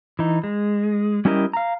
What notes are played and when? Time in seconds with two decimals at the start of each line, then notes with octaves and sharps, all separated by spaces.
0.19 E3 D#4
0.44 G#3
1.25 G3 C#4 E4 G4 A#4 D#5
1.53 F5 A#5